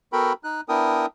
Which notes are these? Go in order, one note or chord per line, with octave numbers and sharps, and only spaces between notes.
B3 F#4 A4 A#4 G5 B5
D#4 F#6
B3 D4 E4 A#4 G5 D#6